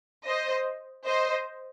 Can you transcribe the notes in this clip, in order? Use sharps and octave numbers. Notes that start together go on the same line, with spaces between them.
C5 D#5
C5 D#5